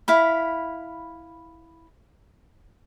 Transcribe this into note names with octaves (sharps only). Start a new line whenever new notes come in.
E4 F5 B5